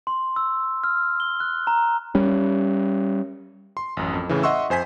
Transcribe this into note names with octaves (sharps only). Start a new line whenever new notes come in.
C6
E6
F6
G7
F#6
A#5
G3 C#4
C6
A1 F#2
F2
A2 C#3 E3
D#5 E5 F#5 C6 C#6 E6
F2 C5 G#5 B6